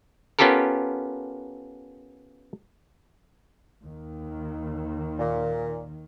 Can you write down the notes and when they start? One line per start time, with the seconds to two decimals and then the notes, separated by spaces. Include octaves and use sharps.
0.39 B3 C#4 F4 G4 A4 A#4
3.85 D#2 D#3
5.19 A#2